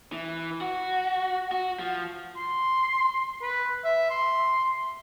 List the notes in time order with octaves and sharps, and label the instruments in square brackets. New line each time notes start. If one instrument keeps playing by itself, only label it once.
[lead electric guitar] E3
F#4
F#4
F3
[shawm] C6
B4
E5
C6